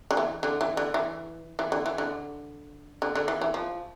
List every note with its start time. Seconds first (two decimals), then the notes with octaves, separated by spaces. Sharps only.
0.11 D3
0.17 E3
0.43 D3
0.61 E3
0.77 D3
0.94 E3
1.59 E3
1.72 D3
1.86 E3
1.98 D3
3.02 D3
3.15 D3
3.28 E3
3.41 E3
3.54 F3